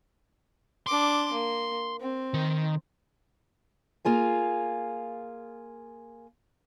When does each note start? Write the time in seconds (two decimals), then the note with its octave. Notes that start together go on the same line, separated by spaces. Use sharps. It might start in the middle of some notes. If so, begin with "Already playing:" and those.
0.87 D4 C6 D6
1.32 A#3
2.01 C4
2.34 D#3
4.05 A#3 F4 G#4 F5